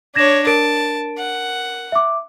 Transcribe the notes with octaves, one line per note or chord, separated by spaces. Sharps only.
D4 C#5 G#6 A#6 E7
A#4 A5 D7
F#5
E5 D6